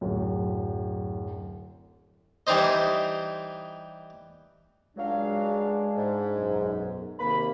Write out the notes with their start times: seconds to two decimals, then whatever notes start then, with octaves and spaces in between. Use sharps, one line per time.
0.01 D1 F#2
2.47 E3 G3 D#4 C5 D#5
4.97 C#2 F#3 G#3 D4 F5
5.96 G#2
6.36 B1 F#2
7.19 D#2 C3 A#3 B5